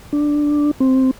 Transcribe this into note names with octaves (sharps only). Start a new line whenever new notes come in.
D4
C4